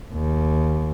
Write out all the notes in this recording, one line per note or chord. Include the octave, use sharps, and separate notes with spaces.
D#2